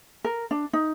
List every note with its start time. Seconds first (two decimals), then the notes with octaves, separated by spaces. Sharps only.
0.24 A#4
0.51 D4
0.73 D#4